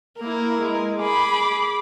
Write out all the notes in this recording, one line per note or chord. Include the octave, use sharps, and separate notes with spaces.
A#3 E4 A#4
G#3
G#4 B5 D6